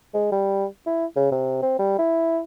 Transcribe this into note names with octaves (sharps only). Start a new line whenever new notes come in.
G#3
G3
E4
C#3
C3
C4
G3
E4